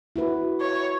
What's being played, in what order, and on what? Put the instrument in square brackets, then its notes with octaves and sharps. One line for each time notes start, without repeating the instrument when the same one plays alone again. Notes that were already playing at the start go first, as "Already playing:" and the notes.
[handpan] E4 F#4 B4
[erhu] C#5